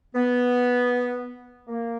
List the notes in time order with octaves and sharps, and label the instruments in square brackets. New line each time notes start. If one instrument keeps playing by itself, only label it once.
[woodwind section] B3
A#3